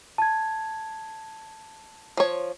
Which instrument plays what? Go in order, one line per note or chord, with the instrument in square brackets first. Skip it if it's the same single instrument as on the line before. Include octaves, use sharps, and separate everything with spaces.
[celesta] A5 G#6
[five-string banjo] F3 C#5